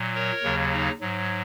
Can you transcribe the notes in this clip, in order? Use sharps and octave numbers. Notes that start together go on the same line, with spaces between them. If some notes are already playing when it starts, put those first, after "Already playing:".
Already playing: A#2 F#3
A#4 C#5
D#2 C#3 F#3
D#4
G#2 F#3